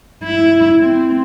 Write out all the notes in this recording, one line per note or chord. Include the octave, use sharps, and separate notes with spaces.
E4
C4